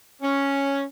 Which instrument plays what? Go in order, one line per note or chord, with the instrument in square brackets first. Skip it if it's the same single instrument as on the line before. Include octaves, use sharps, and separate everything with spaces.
[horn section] C#4